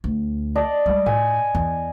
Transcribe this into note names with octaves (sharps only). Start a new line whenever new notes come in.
D2
D5 D#5 A5
G3 G#3
A2 G#5
E2